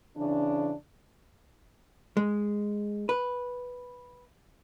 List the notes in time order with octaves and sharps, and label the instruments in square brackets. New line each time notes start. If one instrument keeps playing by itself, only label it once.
[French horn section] C#3 E3 D4
[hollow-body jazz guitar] G#3
B4